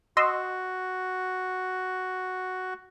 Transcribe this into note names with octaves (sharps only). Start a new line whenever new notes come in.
F#4 D#5 C6 E6